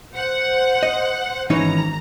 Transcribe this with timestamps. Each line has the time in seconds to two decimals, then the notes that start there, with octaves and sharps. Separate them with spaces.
0.14 C5 F#5
0.83 D#5
1.50 G#1 E3 C#4 D#4 A#5